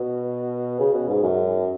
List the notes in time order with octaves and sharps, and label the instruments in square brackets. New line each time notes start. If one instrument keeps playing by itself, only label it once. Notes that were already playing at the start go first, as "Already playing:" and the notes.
Already playing: [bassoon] B2
C#3
B2
G#2
F#2